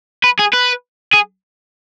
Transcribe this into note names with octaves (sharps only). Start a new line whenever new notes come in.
B4
G#4
B4
G#4